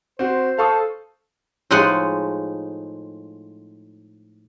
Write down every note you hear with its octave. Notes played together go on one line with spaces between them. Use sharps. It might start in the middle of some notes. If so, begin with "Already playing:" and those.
C4 F#4 C5
A4 F5 C#6 D#6
A2 F3 G#3 D#4 F#5